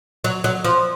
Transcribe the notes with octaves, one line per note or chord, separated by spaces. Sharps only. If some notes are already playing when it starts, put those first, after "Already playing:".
F#3
F#3
F3